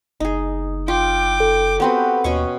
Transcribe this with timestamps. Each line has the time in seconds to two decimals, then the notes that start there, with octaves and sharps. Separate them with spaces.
0.20 F#1 D#4 G#4
0.88 F4 G5 D6
1.40 A4
1.80 B3 C4 F#4 G4 B4
2.24 D#2 B2 C#4 G#5 C#6